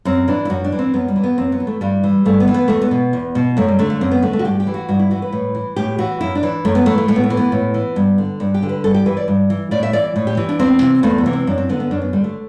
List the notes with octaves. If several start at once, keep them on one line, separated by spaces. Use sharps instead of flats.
F#2 C4
E3 D4
E4
F#2 F#4
D4
E3
C4
F#2 B3
G3
E3
B3
F#2 C4
B3
E3
A3
G2 G3
E3
G2 A3
B3
E3
B3
E2 A3
B3
B2
E2
B2
F#2 A3
G3
D3 A3
A3
F#2 C4
B3
D3 A3
A3
F#4
G2 G4
G4
E3
F#4
G2 F#4
E4
E3 F#4
B4
A2
E3
A2 G4
E3 F#4
F#2 E4
D4
E3
F#2 A3
B3
E3 A3
A3
A2 A3
B3
A3
E3
B3
A2
E3
G2
D3
G2 D4
G4
D3
B4
G2 A4
G4
E3 B4
D5
G2
E3
A2 D5
E5
E3 D5
A2
G4
E3
D4
E2 C4
C3 E3
E2 A3
B3
C3 E3
C4
F#2 D4
C4
D3 B3
B3
F#2 D4
B3
D3 G3
A3